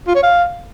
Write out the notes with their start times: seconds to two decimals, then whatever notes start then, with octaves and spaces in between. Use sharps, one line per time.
0.07 F4
0.15 C#5
0.23 F5